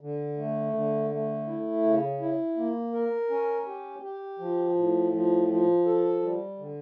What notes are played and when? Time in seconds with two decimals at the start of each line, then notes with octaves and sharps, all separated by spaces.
0.01 D3
0.37 A3
0.73 D3
1.10 A3
1.47 E4
1.84 C#3
2.20 E4
2.57 A#3
2.93 A#4
3.30 C#4
3.66 G4
4.02 G4
4.39 F3
4.76 A2
5.12 F3
5.48 F3
5.85 A4
6.22 G3
6.58 D3